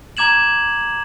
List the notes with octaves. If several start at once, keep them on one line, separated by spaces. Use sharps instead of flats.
A#5 D6 G#6 E7 F#7